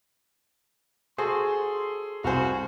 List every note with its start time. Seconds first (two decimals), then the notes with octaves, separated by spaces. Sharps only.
1.18 F#4 G#4 A4 C5 C6
2.24 C2 F#4 C5 F5 G#5